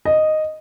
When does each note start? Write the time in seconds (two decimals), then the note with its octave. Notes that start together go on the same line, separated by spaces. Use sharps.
0.05 D#5